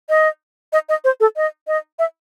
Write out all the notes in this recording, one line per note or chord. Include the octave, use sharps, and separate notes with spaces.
D#5
D#5
D#5
C5
A4
D#5
D#5
E5